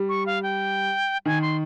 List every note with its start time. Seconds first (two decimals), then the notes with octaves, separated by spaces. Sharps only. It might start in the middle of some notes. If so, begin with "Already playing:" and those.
Already playing: G3
0.09 C#6
0.26 F5
0.43 G5
1.25 D#3 G#5
1.42 C6